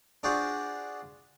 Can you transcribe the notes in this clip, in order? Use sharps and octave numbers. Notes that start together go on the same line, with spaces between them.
D4 F4 F#4 G#4 C5